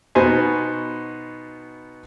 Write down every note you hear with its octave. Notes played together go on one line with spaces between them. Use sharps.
B2 B3 D#4 F#4 C5 G#5